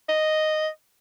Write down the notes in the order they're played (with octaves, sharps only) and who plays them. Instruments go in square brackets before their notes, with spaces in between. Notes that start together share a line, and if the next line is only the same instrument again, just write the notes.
[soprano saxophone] D#5